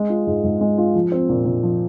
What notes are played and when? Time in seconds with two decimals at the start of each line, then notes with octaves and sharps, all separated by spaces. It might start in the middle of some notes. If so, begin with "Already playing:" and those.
Already playing: G#3
0.10 F4
0.27 G#2
0.44 G#2
0.61 G#3
0.78 F4
0.95 F3
1.12 C4
1.29 A#2
1.45 A#2
1.63 F3